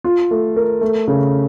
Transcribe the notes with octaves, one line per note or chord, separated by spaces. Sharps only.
F4
A3
A#4
A3
C#3